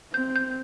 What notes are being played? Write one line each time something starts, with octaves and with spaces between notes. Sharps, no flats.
C4 G6
G6